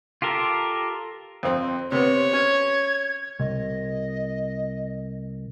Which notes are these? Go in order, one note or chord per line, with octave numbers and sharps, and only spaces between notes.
F4 G4 A4 A#4
F2 C4
C3 B3 C#5
C#4 G#6
C2 D#5